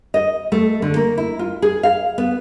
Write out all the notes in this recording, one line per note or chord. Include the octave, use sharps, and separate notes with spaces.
D#5
A3
D3
A#3
E4
F4
G#4
F5
B3